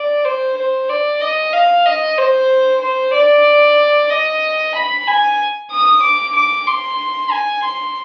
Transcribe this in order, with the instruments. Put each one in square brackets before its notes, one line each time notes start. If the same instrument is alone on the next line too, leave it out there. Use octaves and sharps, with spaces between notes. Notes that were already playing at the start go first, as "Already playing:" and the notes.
Already playing: [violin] D5
C5
C5
D5
D#5
F5
D#5
C5
C5
D5
D#5
B5
G#5
D#6
D6
D6
C6
G#5
C6